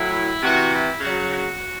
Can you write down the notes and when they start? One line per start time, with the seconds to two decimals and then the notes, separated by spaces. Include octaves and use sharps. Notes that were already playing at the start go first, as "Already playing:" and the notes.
Already playing: A2 F#3 E4
0.43 C3 E3 F#4
0.72 E4
1.00 C#3 F#3 F#4
1.30 F#4